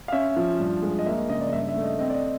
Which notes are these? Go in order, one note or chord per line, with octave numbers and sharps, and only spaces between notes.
F5
C#4 E5
F3
G2
G#3
D#5
A#3 E5
D#5
C#3 D#5
D5
G2 E5
E5
A3
D#5
C4 D#5
D5
D#5